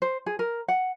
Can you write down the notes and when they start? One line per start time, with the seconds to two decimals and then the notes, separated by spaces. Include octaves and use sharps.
0.02 C5
0.26 G#4
0.39 A#4
0.68 F#5